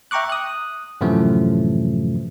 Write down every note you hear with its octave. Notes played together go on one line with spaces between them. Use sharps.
E5 G5 A#5 C#6 D6 F#6
D#6 F#6
F#2 A2 C3 E3 F3 A3